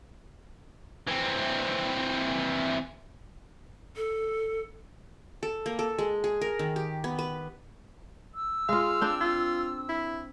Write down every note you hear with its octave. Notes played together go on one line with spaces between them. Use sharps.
E3 C4
A4
A4
A#3
A4
G#3
G#4
A#4
D#3
G4
B3
B4
E6
G#3 F4 F5
C4 D4 G5
F4
E4